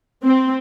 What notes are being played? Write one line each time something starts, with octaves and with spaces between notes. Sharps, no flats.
C4